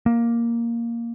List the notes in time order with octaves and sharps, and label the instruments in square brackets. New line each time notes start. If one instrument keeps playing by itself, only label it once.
[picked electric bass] A#3